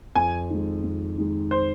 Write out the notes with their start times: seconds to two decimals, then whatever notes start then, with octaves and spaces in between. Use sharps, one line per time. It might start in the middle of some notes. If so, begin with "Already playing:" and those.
0.15 F2 G#5
0.50 D#3 G#3
0.83 F2
1.18 D#3 G#3
1.51 C5